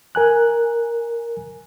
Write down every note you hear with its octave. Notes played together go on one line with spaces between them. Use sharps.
A#4 G#5 F#6